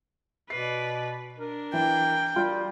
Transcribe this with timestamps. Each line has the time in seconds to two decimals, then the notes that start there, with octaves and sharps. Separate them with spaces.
0.50 B2 B4 D5 C7
1.39 D4 A#4
1.73 E3 G5
2.36 G3 F4